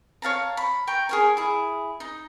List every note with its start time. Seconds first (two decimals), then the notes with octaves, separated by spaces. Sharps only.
0.22 C#5 F5 A5 A#5
0.57 B5
0.87 G5 A#5 C#6
1.09 G#4 A#4 C#5
1.37 E4 G#4
2.00 D#4